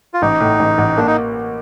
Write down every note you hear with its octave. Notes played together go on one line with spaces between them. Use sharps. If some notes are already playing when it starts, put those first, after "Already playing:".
F4
A1 D#4
A2
A1
A1
A#3 D4
D#4